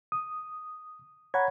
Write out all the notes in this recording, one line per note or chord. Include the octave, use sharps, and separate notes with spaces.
D#6
C#5 F#5 A#5 B5 G#6